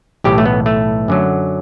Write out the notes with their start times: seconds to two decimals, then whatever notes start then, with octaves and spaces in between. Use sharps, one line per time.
0.24 B1 A2 E3 G4
0.38 A3
0.46 B3
0.66 A3
1.08 F#2 D3 F#3